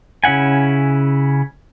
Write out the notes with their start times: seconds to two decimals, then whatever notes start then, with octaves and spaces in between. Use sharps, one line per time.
0.24 C#3 C#4 E4 F#5 G#5